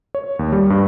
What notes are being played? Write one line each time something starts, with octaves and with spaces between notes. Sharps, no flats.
C#5
D#2
G3
G2